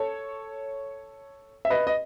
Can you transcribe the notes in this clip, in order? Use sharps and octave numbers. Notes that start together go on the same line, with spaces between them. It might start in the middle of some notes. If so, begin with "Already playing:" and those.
Already playing: A4 C#5
E5
B4 D#5
D#5